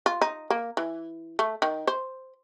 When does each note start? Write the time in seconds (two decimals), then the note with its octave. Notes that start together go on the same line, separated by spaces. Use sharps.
0.06 F4
0.21 D#4
0.50 A#3
0.77 E3
1.39 A3
1.62 D#3
1.87 C5